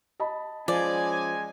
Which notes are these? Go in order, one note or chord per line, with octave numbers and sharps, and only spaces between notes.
D#5 A5 B5
F3 G#3 C#4 D5 G#5